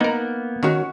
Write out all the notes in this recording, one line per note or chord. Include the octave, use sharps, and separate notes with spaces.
A#3 B3 D#4 A#4
D#3 C#4 F#4